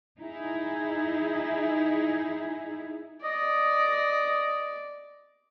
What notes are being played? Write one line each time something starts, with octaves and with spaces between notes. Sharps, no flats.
D#4 E4 G#4
D5 D#5